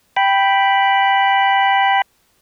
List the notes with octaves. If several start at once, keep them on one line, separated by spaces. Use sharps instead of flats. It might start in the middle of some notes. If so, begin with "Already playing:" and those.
G5 B5